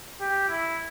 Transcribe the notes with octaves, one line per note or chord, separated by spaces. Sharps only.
G4
E4